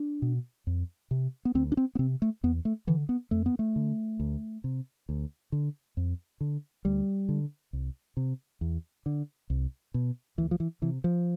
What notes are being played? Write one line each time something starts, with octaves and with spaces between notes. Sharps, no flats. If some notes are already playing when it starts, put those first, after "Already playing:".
Already playing: D4
B2
F2
C3
B3
D2 C4
D4
C4
B3
C3 C4
A3
E2 B3
A3
D3 E3
B3
F2 A3
B3
A3
D3
D2
C3
D2
D3
F2
D3
D2 G3
D3
C2
C3
E2
D3
C2
B2
D2 E3
F3
E3
C3 E3
F3